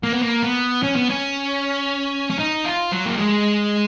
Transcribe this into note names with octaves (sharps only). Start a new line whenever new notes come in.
A#3
B3
A#3
B3
C#4
B3
C#4
C#4
D#4
F4
F#3
A#3
G#3